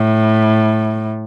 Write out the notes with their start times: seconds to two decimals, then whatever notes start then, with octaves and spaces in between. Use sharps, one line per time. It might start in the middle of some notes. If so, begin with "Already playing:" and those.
Already playing: A2